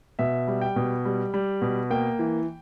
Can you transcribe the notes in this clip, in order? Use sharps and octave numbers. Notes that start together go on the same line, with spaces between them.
B2 E5
G3
G5
B2
G3
G3
B2
A#3 G5
E3